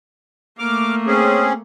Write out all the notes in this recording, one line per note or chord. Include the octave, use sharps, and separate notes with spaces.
A3 A#3 D6 F6
C4 C#4 G#4